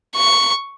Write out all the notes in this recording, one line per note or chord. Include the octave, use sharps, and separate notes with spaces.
C#6